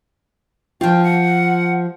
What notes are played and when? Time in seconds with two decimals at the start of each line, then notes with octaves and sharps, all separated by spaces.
0.81 F3 F4 G5
1.04 F#5